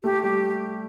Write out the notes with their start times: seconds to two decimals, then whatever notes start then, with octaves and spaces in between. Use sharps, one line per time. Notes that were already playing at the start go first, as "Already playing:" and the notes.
0.04 A3 G4
0.23 G3 G4